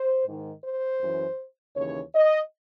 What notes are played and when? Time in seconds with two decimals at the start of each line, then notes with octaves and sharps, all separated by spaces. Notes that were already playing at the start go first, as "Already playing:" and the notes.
Already playing: C5
0.25 G#2 D#3
0.64 C5
1.01 F#2 E3
1.76 D#2 C#3 E3 C#5
2.15 D#5